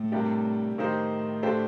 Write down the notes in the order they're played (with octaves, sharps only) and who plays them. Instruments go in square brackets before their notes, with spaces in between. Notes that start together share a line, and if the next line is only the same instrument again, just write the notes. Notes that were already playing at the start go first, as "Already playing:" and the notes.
Already playing: [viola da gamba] A2
[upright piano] C3 G3 A#3 D4 G4
[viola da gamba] A2 [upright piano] D#3 A#3 D#4 G4 C5
[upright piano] D3 A3 D4 G4 C5